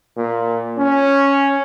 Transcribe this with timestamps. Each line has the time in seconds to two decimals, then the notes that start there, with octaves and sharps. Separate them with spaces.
0.17 A#2
0.78 C#4